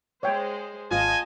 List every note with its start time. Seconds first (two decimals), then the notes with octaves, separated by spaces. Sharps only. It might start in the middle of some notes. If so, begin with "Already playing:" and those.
0.23 G#3 C5 C#5 E5 G5
0.91 G#1 F4 D#5 G#5 A5